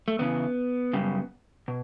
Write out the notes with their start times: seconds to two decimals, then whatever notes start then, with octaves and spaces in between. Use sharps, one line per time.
0.08 A3
0.19 E2 C#3 E3 B3
0.93 F#2 C#3 G3
1.68 B2